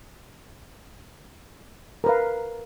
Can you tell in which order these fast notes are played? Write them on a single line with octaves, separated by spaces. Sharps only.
A#4 B4 F5